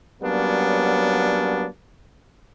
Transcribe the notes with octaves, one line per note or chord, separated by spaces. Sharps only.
F#3 G3 A#3 B3 C#4 D4